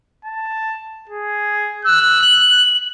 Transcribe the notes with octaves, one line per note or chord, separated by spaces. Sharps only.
A5
G#4
E6 F#6
F#7